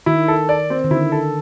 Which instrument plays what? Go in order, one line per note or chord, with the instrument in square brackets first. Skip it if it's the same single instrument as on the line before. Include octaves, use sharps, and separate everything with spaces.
[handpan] D#3 [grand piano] E4
[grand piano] A4
D5
C4
[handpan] D#3
[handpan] D3 [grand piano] E4
[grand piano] A4